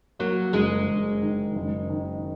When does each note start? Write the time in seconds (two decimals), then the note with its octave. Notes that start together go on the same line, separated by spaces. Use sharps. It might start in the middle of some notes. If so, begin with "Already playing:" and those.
0.19 F#3 A#3
0.53 F#1 G#3
0.88 F#1
1.22 D#3
1.56 F#1
1.90 D#3